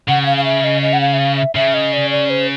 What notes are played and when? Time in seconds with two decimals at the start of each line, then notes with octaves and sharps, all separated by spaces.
0.08 C#3 F#5
0.23 F#5
0.26 F5
0.37 F5
0.45 E5
0.64 D#5
0.82 D#5
0.93 F#5
1.01 F5
1.13 E5
1.19 F5
1.37 E5
1.55 C#3 E5
1.74 D#5
1.93 D5
2.10 D5
2.30 C5